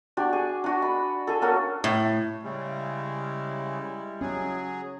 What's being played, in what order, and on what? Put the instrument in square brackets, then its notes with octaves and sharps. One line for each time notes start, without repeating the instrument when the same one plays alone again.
[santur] D4 F#4 G4
G#4
D4 F#4
B5
G#4 A4
A#3 C#4 F#4 A4
[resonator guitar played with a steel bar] A2
[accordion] C#3 [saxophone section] G3 G#3 E4
[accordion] F#3 G#4 [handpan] C#4